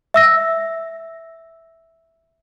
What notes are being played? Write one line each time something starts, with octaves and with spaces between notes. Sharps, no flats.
E5 E6 A#6